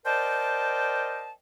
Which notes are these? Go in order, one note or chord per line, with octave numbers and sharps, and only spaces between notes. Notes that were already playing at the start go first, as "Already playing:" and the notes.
A#4 C5 D5 D#5 G5 A5